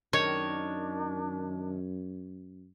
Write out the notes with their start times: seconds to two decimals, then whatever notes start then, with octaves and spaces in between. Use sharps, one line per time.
0.13 F#2 D#3 D4 C#5